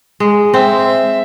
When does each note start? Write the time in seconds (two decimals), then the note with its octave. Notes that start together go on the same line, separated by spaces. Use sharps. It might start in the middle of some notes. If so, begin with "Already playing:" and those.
0.20 G#3
0.54 C4 E5